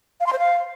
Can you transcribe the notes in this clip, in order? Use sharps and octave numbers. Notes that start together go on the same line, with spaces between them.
F5
C6
C5
F5